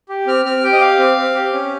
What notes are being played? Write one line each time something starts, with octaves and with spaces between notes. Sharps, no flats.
G4
C4 F6
C4 F6
G4 G5
D#5
G4 F5
C4
C4
G4
C#4